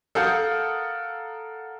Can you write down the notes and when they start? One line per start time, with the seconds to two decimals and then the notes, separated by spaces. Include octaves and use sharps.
0.15 A4 A#4 F5 F#5 D#6 G6